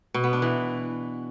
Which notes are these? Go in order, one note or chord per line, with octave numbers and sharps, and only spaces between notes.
B2
B3
D4
E3